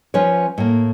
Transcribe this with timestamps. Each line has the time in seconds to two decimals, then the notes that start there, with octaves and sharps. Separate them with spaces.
0.14 F3 C#4 F4 B4 C#5
0.58 A2 A#3